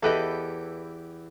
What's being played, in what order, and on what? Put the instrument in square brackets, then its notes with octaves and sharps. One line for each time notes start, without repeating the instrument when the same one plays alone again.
[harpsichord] E2 E4 G4 [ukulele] A4 B4 D#5